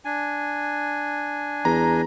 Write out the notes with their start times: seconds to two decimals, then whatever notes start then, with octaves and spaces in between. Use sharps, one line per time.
0.05 D4 G#5
1.65 E2 A#5